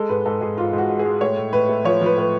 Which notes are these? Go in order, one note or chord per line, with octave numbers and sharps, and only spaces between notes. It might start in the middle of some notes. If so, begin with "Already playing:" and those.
Already playing: G#3 A4
G#2 B4
G#2 A4
G#2 G#4
G#2 F4
G#2
F#4
G#3
G#4
G#3
A2 C#5
A2
A2 B4
A3
F3 C#5
F3 B4
A2 B4